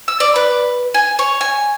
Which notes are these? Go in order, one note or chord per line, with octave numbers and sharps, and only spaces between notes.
E6
D5
B4
G#5
C#5
G#5